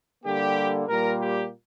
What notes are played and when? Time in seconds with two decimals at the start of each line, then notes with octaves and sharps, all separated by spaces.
0.24 D3 G3 A#3 G4
0.87 A#2 G3 A#3 A#4
1.19 G4